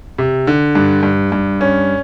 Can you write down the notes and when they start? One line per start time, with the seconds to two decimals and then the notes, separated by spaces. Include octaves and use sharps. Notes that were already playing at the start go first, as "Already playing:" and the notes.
0.18 C3
0.47 D3
0.75 G2
1.03 G2
1.32 G2
1.61 C#4